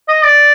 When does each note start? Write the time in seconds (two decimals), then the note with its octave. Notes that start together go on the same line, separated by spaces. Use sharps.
0.08 D#5
0.24 D5